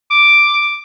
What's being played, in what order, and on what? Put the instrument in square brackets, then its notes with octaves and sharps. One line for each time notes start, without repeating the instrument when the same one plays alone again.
[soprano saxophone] D6